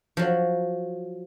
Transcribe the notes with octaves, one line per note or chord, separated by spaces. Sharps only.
F3 F#3